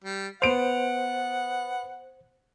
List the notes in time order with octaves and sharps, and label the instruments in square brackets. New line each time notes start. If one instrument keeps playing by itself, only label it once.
[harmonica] G3
[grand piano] B3 D7 F7 [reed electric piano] C5 [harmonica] F#5